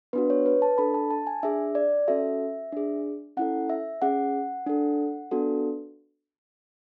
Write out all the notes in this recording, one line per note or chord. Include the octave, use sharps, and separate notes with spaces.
B3 D4 F#4 B4
C#5
B4
A5
D4 A4 B5
A5
A5
G#5
D4 G#4 E5
D5
C#4 F#4 A4 E5
D4 G#4
C#4 E4 A4 F#5
E5
C#4 G#4 F#5
D4 A4
B3 D4 F#4 A4